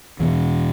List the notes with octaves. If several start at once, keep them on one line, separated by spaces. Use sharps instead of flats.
E2 B2 E3